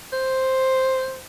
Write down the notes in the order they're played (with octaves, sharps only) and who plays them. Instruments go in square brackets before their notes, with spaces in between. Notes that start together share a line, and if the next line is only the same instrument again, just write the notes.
[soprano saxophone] C5